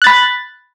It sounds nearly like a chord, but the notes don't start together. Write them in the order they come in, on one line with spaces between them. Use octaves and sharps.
F#6 A6 B5